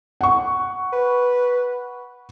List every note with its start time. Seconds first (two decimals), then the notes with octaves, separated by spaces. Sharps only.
0.21 F#5 C#6
0.93 B4